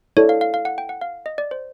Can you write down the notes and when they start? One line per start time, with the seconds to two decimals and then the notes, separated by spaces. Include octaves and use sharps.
0.17 E4 A4 C#5 D5
0.29 F5
0.41 F5
0.54 F5
0.65 F#5
0.78 G5
0.89 F#5
1.01 F5
1.26 D#5
1.38 D5
1.51 C5